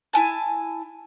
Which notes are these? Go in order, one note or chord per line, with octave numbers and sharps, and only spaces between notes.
E4 G#5 A5